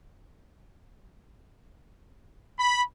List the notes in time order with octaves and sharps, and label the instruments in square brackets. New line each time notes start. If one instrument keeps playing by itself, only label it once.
[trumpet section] B5